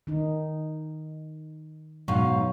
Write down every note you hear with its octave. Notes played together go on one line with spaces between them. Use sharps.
D#3 D#4
G#2 B2 F#3 F5 C#6